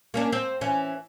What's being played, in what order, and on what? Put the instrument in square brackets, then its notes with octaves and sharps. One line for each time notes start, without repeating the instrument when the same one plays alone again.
[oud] A#3 C#4 D4
C4
E3 C#4